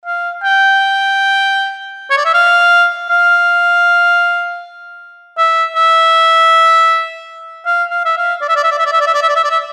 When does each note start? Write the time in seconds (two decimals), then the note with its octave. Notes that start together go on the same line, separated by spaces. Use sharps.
0.06 F5
0.43 G5
2.10 C#5
2.17 D5
2.25 E5
2.34 F5
3.10 F5
5.38 E5
5.76 E5
7.66 F5
7.91 F5
8.05 E5
8.17 F5
8.41 D5
8.49 E5
8.56 D5
8.64 E5
8.71 D5
8.78 E5
8.86 D5
8.92 E5
9.01 D5
9.07 E5
9.14 D5
9.22 E5
9.29 D5
9.36 E5
9.44 D5
9.50 E5